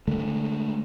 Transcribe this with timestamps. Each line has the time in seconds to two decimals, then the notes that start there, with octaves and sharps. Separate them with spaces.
0.08 D3 G#3 A3